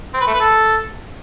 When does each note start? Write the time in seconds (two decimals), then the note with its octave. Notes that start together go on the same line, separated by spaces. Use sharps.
0.14 C4
0.21 B4
0.27 A3
0.34 B4
0.41 A4